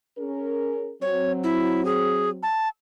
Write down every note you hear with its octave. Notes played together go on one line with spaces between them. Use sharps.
C#4 G#4 A#4
F#3 C4 C#5
E4
G#4
A5